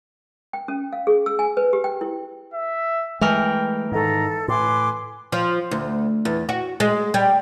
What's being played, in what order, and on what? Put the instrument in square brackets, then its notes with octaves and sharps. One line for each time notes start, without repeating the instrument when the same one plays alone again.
[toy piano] G5
C#4
F5
G#4
E6
G#5
B4
G4
G5
E4
[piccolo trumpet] E5
[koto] E3 A#4 [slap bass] G#3 A3 [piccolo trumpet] G5
[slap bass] G#2 D#3 [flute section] A4 [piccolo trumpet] A#5
[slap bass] A2 [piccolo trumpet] B4 [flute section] G#5 C6 D6
[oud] F3
D2
E2
F#4
G#3
G3